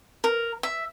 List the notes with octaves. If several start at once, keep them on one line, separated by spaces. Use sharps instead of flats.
A#4
E5